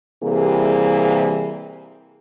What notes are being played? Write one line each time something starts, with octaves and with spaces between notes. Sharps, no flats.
C3 E3 G3 A#3 G#4